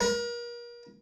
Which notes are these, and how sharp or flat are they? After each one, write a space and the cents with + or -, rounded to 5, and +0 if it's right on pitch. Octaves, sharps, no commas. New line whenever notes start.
A#4 +35